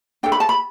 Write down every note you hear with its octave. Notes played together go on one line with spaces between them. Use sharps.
D4 A4 G5
B5
A5
B5